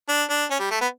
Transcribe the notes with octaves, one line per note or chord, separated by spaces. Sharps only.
D4
D4
C#4
G3
A3
B3